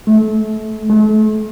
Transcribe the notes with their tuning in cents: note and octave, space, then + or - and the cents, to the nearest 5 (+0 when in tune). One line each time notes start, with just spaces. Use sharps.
A3 -30
A3 -40